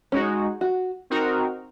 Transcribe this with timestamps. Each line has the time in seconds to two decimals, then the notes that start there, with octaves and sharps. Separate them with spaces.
0.12 G#3 C#4 D#4 F#4
0.61 F#4
1.10 C4 D#4 F#4 A#4